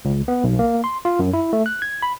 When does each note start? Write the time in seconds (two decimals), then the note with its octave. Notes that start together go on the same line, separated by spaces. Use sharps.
0.05 C#2
0.28 B3
0.44 B1
0.59 A#3
0.84 C6
1.05 F4
1.19 F#2
1.33 E4
1.53 A3
1.66 F#6
1.82 G#6
2.02 B5